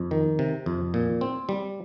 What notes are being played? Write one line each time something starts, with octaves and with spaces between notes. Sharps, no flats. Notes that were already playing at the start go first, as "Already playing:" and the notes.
Already playing: F2
D#3
C3
F2
A#2
C4
G3